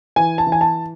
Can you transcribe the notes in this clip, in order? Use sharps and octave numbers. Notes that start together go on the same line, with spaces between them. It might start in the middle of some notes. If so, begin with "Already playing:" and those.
E3 G#5
A5
E3
G#5
A5